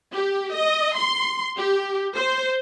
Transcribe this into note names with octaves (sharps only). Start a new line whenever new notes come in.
G4
D#5
C6
G4
C5